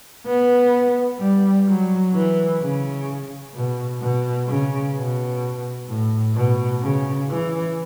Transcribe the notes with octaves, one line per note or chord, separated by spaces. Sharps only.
B3
G3
F#3
E3
C#3
B2
B2
C#3
B2
A2
B2
C#3
E3